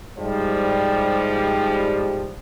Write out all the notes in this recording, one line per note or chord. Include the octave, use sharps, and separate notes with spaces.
G#2 F3 G3